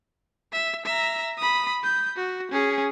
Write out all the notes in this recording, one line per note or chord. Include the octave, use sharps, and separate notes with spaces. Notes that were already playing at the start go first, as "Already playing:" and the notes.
E5
E5 A#5
B5 D#6
G6
F#4
C#4 G#4